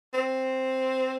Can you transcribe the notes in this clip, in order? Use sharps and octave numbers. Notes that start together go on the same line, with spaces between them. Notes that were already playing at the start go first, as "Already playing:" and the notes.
C4